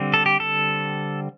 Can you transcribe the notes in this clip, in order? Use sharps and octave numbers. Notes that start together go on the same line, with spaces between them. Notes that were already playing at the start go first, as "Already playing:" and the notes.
Already playing: D3 G3 C4
A4
G4
A4